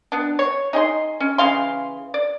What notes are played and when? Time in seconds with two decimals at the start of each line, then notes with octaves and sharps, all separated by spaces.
0.12 B3 D4
0.39 C#5
0.73 D#4 G#4 D#5 C6
1.20 C#4
1.38 C#3 E3 F5 C6
2.14 D5